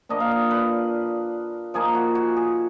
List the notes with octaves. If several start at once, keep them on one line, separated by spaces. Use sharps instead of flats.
A#2 F3 A#3 D4 D#5
F5
D#5
B4
F3 A#3 D#4 G#4
F#4
F#4
G#4